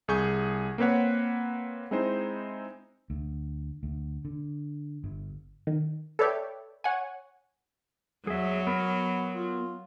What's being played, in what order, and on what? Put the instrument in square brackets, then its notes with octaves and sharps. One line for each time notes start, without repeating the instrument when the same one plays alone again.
[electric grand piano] C2 G#4 C#6 G6
A#3 C4 B4 C#5 F#5
G#3 C4 D#4 E4 C5
[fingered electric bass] D2
D2
D3
G1
[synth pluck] D#3
A4 B4 C#5 D5 E5 G5
C#5 F#5 G#5
[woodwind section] E2 [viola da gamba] F#3 [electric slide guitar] G#4 E5
[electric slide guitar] B3 A#4 [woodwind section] B5
[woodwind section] F4